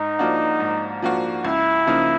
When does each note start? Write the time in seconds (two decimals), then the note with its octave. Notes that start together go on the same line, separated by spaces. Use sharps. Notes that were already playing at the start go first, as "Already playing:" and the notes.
Already playing: G#2 D#4
0.19 F3 A#3 D4 F#4
0.60 G#2
1.02 F3 A#3 D4 F#4
1.44 C#2 E4
1.87 C#3 F3 A#3 D#4